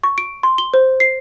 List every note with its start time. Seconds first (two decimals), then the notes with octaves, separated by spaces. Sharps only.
0.04 C#6
0.18 D7
0.43 C6
0.58 G7
0.74 C5
1.00 C7